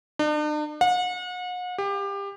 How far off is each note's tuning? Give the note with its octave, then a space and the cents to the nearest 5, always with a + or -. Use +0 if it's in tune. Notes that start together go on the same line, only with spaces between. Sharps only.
D4 +45
F#5 -40
G4 +25